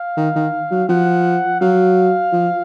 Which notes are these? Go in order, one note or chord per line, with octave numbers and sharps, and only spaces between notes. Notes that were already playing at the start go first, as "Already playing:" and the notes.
Already playing: F5
D#3
D#3
F#3
F3 F#5
F#3 F5
F3